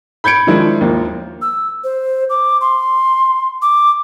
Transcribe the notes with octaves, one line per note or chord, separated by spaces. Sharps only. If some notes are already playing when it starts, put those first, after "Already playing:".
B5 G6 G#6 C#7 D7
D#3 F3 G#3 D4 E4
D#2 F3 A#3
E6
C5
D6
C6
D6